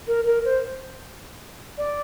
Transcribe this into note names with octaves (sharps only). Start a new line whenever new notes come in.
A#4
A#4
C5
D5